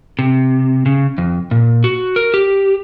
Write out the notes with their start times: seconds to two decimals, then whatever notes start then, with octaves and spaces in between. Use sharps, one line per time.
0.19 C3
0.86 C#3
1.18 F2
1.51 A#2
1.84 F#4
2.16 A#4
2.34 G4